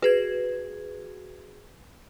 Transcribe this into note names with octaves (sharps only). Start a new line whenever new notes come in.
F#4 G#4 B4 G#6